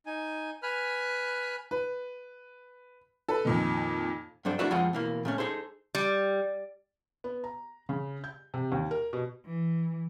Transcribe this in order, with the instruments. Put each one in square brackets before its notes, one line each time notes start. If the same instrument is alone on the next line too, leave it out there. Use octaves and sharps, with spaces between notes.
[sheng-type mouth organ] D#4 G#5
B4 G#5 B5 F6 F#6
[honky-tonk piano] B4
A4 B4
F2 A#2 D#3
[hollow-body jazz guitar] G2 F#3 D4 A4 C5
A3 D4 E4 F#4 B4 E5
F2 G#3 C4 F4 G#4 F#5
B2 E3 A#3
A#2 A3 C#4
D#4 G#4 A4 C5
[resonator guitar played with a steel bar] G3
[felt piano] B3
A#5
C#3
G6
C3
D#2
A#4
B2
[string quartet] E3